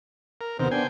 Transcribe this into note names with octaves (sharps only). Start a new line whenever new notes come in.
A#4
D#2 C3 D#3 B3 A#4 C5
B3 D4 C5 G5 G#5